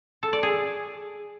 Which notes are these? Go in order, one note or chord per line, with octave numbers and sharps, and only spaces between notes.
A4
D5
G#4